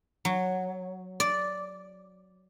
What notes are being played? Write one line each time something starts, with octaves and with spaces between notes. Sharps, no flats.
F#3
D5